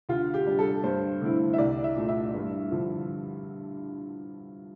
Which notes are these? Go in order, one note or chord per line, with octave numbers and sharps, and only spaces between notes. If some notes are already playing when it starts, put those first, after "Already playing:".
D2 F4
G4
C3 G3 D4
A4
G2 C5
D3 A3 C4 E4
E5
C2 D5
E5
A#2 A3
E5
G2
D3 F3